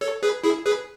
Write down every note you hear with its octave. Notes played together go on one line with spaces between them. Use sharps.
A4 C#5
G#4 B4
E4 G#4
G#4 B4